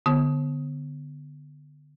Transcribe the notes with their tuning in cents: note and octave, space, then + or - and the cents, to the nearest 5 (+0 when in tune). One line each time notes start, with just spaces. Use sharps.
D3 +0 B3 +0